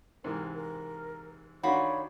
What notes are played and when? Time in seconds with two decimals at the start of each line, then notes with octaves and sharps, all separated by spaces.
0.24 G#2 C3 E3 A#4
0.55 A#4
1.63 D#3 D4 F4 F#4 C#5 B5